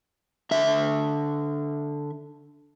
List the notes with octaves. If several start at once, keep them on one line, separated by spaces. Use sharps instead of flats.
D3 E5